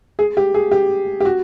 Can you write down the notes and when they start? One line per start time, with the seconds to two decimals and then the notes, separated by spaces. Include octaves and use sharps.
0.19 G#4
0.37 G4
0.54 G#4
0.71 G4
1.20 G4
1.25 F#4